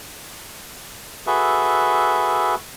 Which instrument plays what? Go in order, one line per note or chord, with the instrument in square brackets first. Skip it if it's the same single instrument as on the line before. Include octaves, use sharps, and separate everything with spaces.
[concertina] F#4 G#4 A4 B4 E5